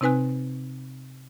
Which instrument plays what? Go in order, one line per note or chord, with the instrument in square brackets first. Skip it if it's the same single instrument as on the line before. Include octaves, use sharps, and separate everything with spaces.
[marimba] C3 C4 D#4 B4 G#5 F#6